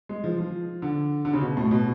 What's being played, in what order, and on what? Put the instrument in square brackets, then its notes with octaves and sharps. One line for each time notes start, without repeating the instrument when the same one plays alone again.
[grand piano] G#3
F3
F3
D3
D3
C#3
B2
A2
B2